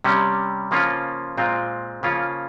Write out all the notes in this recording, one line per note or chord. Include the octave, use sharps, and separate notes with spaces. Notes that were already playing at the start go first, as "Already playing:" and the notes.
C3 G3 C#4
C#3 F3 A#3 C#4 F4
A#2 G#3 C4 F4
C#3 F3 A#3 C#4 F4